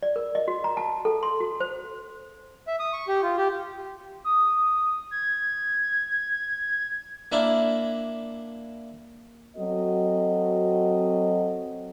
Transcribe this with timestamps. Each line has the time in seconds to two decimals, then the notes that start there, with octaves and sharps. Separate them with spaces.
0.03 D5
0.16 A#4
0.35 D#5
0.48 F#4
0.64 A#5
0.77 A5
1.05 A4
1.23 C6
1.40 F#4
1.60 C5
2.67 E5
2.79 D#6
2.93 C#6
3.08 G4
3.23 F4
3.37 G4
4.24 D#6
5.11 G#6
7.32 A#3 D4 E4
9.57 F#3 C4 F#4 A4 D#5